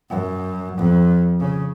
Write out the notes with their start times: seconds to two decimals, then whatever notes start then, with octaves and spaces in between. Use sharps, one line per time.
0.10 F#2
0.77 F2
1.40 C#3